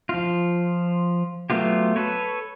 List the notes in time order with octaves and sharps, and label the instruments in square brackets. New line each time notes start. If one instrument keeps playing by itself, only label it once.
[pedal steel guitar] F3 F4
F#3 A3 B3 F4 G4
A4 B4 C#5